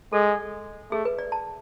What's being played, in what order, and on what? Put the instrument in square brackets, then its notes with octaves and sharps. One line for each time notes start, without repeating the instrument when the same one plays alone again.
[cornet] G#3 [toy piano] A4
[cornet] A3 [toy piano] G#4
[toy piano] B4
D5
A5